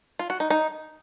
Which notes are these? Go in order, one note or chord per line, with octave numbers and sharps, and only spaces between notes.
F4
F#4
D#4
D#4